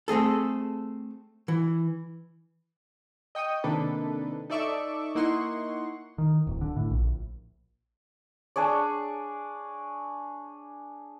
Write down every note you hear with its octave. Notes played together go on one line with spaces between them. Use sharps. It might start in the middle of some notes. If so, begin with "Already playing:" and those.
A3 C4 G#4 A4
E3
D#5 G5 C#6 D#6
C3 D#3 A#3 D4 A4 B4
D#4 A4 D5 E5 C#6 D6
A#3 D#4 E4 F#5 C6 C#6
D#3
D1
D3
A2
A#1
D4 G#4 C#5 D5